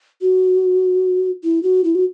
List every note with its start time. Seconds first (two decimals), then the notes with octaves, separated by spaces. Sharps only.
0.22 F#4
1.44 E4
1.63 F#4
1.84 E4
1.95 F#4